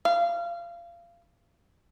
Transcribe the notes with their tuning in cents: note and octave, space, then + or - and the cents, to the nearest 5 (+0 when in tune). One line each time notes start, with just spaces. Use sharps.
F5 -25